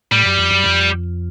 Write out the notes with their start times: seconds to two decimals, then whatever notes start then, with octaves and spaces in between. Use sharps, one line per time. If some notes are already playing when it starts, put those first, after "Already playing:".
0.11 A2 G3
0.26 F#2
0.39 F2
0.52 F#2
0.66 F2